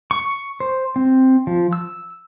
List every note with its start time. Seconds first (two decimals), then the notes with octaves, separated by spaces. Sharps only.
0.11 C#6
0.60 C5
0.96 C4
1.47 F3
1.73 E6